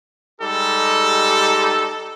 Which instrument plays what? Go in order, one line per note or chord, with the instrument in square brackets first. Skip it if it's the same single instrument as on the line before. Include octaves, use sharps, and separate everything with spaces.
[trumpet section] G3 G#3 D#4 G4 A4